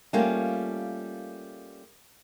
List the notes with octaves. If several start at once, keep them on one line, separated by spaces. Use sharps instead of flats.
G3 A3 A#3 C#4 F4